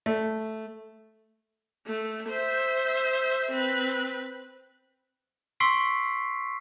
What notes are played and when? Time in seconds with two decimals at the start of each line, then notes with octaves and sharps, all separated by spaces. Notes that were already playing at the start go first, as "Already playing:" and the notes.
0.06 A3
1.86 A3
2.29 C5 E5
3.51 C4 B4
5.60 C6 C#6 E6 B6 C7 D7